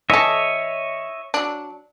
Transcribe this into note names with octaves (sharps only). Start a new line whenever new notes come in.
E3 A4 C#5 D#5 E5
F#3 D4